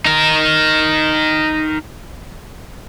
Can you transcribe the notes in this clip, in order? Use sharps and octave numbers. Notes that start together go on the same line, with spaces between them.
D#4 A#4